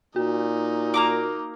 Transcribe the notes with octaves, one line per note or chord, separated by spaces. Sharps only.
A#2 D#4 F#4
A#3 A#5 D6